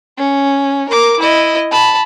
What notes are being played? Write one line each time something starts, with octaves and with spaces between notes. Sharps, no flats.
C#4
A#4 D6
E4 D#5
A5 B5